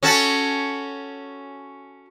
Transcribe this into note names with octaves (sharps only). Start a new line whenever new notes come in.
C#4 F#4 A4